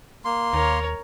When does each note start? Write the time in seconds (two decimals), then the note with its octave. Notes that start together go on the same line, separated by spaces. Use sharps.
0.25 A#3 C6
0.53 D#2 A#4 C#5